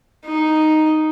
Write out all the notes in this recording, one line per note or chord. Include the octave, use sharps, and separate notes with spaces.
D#4